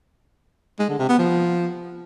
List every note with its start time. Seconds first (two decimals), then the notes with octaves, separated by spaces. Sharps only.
0.79 G#3
0.89 D3
0.99 C3
1.09 B3
1.19 F3